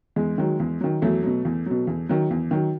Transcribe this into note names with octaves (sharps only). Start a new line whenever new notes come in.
E2 G#3
D#3 F#3
E2
D#3 F#3
E2 F#3 A3
B2 F#3
E2
B2 F#3
E2
D#3 F#3
E2
D#3 F#3